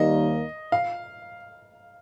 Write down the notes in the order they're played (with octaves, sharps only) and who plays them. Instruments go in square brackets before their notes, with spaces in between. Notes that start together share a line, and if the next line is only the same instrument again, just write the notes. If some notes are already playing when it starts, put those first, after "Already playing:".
Already playing: [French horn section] D#2 D#3 G3 A#3 D#4 [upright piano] D#5
[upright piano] F5